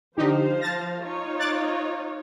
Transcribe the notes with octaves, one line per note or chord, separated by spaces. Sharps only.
D3 F3 D#4 G4 C5 F5
A5 A6 A#6
D#4 F4 C#5
D6 F#6 A6